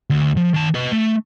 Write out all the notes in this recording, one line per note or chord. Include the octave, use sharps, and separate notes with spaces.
D2
F3
D#3 A5
B4 D#5
A3